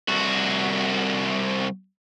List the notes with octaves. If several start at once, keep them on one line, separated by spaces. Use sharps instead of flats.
C2 F#4